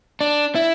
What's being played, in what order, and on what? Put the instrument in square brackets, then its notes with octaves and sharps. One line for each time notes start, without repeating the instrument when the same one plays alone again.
[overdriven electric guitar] D4
E4